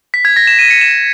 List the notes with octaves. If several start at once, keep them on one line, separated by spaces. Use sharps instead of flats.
B6
G#6
A#6
E7
D#7
C#7
E7